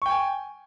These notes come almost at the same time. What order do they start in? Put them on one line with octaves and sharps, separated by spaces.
C#6 G5 G#5